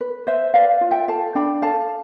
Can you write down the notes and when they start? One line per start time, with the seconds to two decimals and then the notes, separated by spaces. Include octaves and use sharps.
0.01 B4
0.27 B4 C5 E5
0.54 B4 D5 F5
0.81 F4
0.91 E5 G5
1.08 A4 F5 A5
1.35 D4 G5 B5
1.62 A4 F5 A5